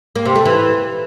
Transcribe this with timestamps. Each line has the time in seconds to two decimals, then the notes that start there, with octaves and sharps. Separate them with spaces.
0.16 A#3
0.25 C3
0.35 A3
0.45 E3